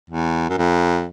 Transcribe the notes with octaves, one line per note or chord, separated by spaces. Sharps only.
E2
F#2
F2